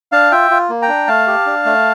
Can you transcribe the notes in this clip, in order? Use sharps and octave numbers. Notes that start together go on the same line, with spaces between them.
D4 F5 A5
F4 E5 G5
F4
A#3
G5 A#5
D4
A3 F5 A5
G4
D4
A3